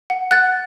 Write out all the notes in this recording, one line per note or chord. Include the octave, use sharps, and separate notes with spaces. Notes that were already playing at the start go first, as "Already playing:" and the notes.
F#5
F#5 F#6 A6